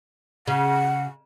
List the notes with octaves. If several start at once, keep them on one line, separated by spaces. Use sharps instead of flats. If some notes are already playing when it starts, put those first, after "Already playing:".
C#3 F#5